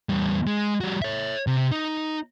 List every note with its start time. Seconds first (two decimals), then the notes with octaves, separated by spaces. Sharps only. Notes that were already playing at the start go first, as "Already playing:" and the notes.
0.09 E2 G3
0.47 G#3
0.81 G3 F#4
1.02 C#5 E5
1.47 C3
1.72 D#4